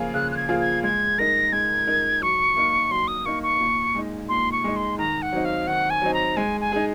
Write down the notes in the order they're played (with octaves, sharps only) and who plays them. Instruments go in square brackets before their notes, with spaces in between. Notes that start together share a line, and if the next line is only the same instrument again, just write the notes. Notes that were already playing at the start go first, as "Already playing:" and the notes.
Already playing: [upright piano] C#3 F3 A#3 F4 G#4
[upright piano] C#3 [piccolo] F#6
[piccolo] F#6
G#6
[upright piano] F3 A#3 F4 G#4
[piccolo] G#6
[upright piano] G#3 [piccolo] G#6
[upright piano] D#4 A#4 [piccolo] A#6
[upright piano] G#3 [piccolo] G#6
[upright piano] D#4 A#4
[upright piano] F#3 [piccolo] C#6
[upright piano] A#3 D#4
[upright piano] F#3 [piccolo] C6
[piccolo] D#6
[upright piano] A#3 D#4 [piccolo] C#6
[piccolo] C#6
[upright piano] A#2
G#3 D#4
[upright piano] A#2 [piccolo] C6
[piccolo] C#6
[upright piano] G#3 D#4
[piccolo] C6
[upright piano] D#3 [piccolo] A#5
[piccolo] F#5
[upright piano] F#3 C4 D#4
[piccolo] F5
[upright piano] D#3 [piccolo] F#5
[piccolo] G#5
[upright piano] F#3 C4 D#4
[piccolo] A#5
[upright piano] G#3 [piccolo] G#5
[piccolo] G#5
[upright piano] D#4 G#4